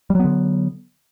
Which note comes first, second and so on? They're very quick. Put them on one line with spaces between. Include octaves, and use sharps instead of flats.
G3 F#3 B3 D3